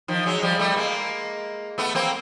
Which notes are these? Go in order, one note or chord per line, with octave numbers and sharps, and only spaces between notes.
D#3 F3
F#3 G#3
F3 G3
G3 A3
G#3 A#3
A3 B3
A#3 C4